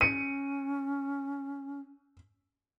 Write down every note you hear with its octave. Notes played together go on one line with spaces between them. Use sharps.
C#4 C#7 D#7